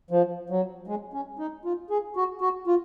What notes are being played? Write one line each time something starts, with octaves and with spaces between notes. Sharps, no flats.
F3
F#3
G#3
C#4
D#4
F4
G#4
F#4
F#4
F4